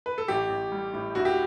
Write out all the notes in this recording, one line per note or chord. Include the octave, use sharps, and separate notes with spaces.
B4
A4
A1 G4
A1
G3
A2
D2 F#4
G4